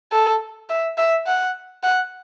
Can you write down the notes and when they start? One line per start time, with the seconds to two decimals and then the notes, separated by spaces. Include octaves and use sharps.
0.12 A4
0.69 E5
0.98 E5
1.27 F#5
1.83 F#5